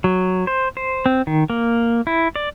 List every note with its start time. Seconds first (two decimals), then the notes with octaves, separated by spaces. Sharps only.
0.04 F#3
0.47 C5
0.77 C5
1.06 C4
1.27 D#3
1.50 A#3
2.07 E4
2.36 D5